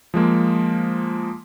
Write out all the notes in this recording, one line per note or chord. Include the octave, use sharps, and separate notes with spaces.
F3 G#3 A#3